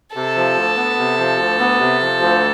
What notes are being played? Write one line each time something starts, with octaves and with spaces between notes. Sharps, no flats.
C3 A4
F3
D2
B3
C3
F3
D2
B3
C3
F3
D2